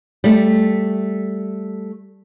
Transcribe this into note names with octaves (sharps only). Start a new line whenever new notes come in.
G3 A3